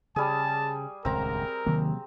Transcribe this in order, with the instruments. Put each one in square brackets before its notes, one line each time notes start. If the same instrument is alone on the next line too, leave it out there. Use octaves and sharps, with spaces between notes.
[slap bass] C#3 [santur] G3 G#4 [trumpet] A5
[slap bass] D#1 C#2 G2 [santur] C4 A#5 [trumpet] A#4
[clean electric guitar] D#2 [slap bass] C3 F#3 A#3